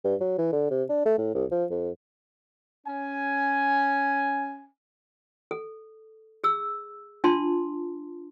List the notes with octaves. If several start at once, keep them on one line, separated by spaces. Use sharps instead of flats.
G2
F#3
E3
D3
C3
D4
A3
A2
C2
F3
F2
C#4 G#5
A4
G#4 E6
D4 F4 A5 C6